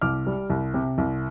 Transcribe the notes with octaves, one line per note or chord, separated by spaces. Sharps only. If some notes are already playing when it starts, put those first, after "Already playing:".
C2 D6 F6
G3
C2
C3
C2